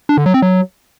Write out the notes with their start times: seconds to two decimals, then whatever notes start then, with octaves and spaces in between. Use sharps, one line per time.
0.09 D4
0.17 D3
0.26 F#3
0.34 C4
0.42 F#3